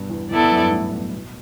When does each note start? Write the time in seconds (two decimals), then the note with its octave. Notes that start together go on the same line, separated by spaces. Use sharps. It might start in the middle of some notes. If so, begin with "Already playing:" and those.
Already playing: G2 B2
0.09 E2
0.30 E2 B3 E4 A4 D5
0.44 E2
0.52 F#2
0.58 G2
0.71 A2
0.93 B2
1.13 B2